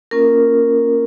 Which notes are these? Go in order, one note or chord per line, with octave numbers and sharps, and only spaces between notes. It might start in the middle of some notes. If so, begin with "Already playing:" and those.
A#3 C#4 F4 A#4